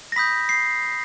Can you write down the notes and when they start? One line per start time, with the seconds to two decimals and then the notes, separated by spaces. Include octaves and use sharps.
0.12 A#6
0.16 B5 D#6 G6 B6
0.49 C7